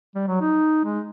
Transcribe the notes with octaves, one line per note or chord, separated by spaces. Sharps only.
G3
F#3
D#4
G#3